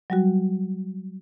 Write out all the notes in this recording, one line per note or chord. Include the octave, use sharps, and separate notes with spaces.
F#3 G3 F#4